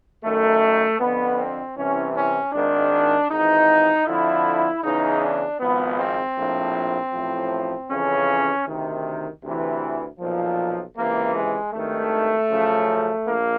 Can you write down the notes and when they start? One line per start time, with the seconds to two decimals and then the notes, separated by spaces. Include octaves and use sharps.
0.24 F#2 D#3 A3
1.00 F2 D3 F3 B3
1.38 C4
1.76 C2 C3 E3 C#4
2.15 C#4
2.53 G#1 G#2 D#3 D4
3.30 G#1 G#2 E3 D#4
4.06 F2 D3 F3 E4
4.84 E2 C#3 E3 D#4
5.23 D4
5.60 G#1 G#2 F3 B3
5.99 C4
6.37 A#1 A2 F3
7.13 A1 A2 F3
7.90 F2 C#3 E3 C#4
8.67 D2 C3 D#3
9.44 D2 C3 E3
10.20 B1 A#2 F3
10.97 C#2 C3 E3 A#3
11.35 G#3
11.73 G#1 G2 D#3 A3
12.50 F#2 C#3 F3
13.27 A#1 A#3